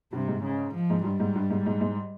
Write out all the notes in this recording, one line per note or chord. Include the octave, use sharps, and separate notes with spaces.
G2 C3
G#2
C#3
F3
G#2
G2 G3
G#2
G2
G#2
G#2
G#2